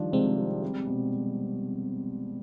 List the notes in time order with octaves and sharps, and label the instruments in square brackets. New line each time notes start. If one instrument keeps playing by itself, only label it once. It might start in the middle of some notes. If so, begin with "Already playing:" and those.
Already playing: [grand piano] D#3 F3 D4 [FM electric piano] G3
[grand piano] C3 [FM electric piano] G#3 C4
[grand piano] G3
G3
B2